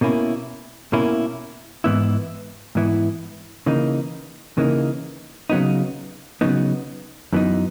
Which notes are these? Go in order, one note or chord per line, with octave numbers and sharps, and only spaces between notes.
B2 A#3 C#4 E4
B2 A#3 C#4 E4
G#2 E3 B3 E4
G#2 E3 B3 E4
C#3 E3 A#3 D#4
C#3 E3 A#3 D#4
C#3 F#3 B3 D#4
C#3 F#3 B3 D#4
F#2 E3 B3 D#4